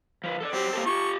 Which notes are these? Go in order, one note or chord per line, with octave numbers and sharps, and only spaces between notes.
F3 B4
A4 C5 D5
F#3 C4 G4
A#3 G4 A4
F4 G4 C#6